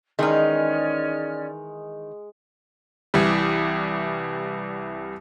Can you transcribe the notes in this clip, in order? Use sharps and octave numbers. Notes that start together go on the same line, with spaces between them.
D#3 E3 G#3 C#4 D#4 D5 F6
C2 E3 G3